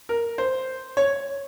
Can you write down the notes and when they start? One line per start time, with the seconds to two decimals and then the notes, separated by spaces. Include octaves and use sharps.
0.09 A#4
0.38 C5
0.97 C#5